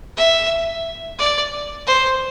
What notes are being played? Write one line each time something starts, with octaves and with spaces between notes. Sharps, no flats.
E5
D5
C5